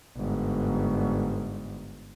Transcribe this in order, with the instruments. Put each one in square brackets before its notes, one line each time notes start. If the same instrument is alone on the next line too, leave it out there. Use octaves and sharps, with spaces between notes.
[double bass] G1 G#2